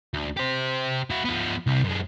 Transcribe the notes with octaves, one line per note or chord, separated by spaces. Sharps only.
D2
G4 C5
E4 F#4
F3 B3
C2 C3
F#2 G#3